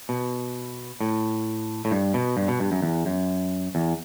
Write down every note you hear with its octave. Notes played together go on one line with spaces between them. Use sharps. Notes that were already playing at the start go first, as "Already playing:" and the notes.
B2
A2
A2
G2
B2
G2
B2
G2
F#2
E2
F#2
E2